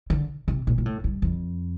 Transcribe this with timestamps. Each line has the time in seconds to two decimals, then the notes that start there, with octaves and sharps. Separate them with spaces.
0.10 D3
0.48 C3
0.67 A#2
0.78 A#2
0.86 A2
1.04 G2
1.22 F2